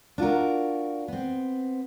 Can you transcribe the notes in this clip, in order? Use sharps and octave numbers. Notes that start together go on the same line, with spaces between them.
D4 F4 F#4 A#4
B3 C4